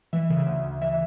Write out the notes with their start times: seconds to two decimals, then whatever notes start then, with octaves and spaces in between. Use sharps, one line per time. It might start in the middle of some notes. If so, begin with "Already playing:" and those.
0.13 E3 E5
0.30 C#3
0.46 D2
0.65 D2
0.81 E3 E5